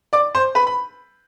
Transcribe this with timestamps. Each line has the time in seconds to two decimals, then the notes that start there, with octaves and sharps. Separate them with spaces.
0.13 D5 D6
0.35 C5 C6
0.55 B4 B5
0.67 B5